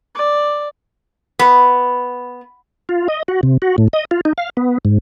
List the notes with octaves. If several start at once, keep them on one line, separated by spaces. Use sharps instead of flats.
D5
B3
F4
D#5
F#4
C3
F#4
A2
D#5
F4
D#4
F5
B3
G#2